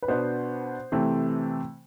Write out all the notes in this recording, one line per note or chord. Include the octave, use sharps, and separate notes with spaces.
B4
B2 B3 D4 C5
C3 E3 A3 C4